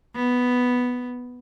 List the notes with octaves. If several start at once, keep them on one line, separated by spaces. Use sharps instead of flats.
B3